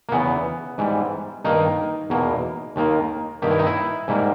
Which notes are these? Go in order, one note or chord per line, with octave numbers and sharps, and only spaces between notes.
A#3
E2 C#3 E3 B3
G#2 E3 G3
G2 D#3 A#3 D#4
E2 B2 A#3
D#2 D#3 A#3
G2 D#3 A#3 G4
E4
D#4
E4
G#2 G3 A#3